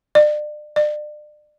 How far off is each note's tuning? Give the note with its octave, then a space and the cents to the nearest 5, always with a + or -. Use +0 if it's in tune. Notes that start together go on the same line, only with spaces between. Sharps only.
D5 +35
D5 +35